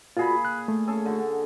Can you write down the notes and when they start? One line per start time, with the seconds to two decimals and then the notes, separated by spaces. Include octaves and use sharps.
0.17 A#2 F4 F#4 G#4 B5
0.45 F#6
0.68 A3
0.87 C#4 G#4 A4
1.05 D3 F#4